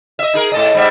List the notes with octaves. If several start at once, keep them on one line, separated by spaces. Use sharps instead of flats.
D#5 E5
D#4 G#4 A#4
A2 A4 D#5
G#2 G3 E5